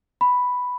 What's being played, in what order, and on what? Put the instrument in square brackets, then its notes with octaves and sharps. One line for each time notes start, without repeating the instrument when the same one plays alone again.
[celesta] B5